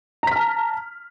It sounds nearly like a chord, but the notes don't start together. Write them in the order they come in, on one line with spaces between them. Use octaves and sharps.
A#5 B6 F6 A5